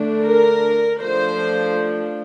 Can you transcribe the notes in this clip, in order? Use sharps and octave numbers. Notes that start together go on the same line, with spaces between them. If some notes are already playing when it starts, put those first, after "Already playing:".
Already playing: D3 A3 D4
A#4
F3 A3 D4 C5